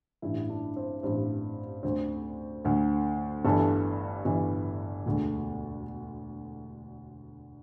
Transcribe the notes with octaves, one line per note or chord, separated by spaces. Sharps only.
A1 G2 E3 E4
D4
C4
A1 G2 E3 C4
D2 D3 C4
D2 D3
G1 G2 E3 A4
G1 G2 E3
E1 D2 D3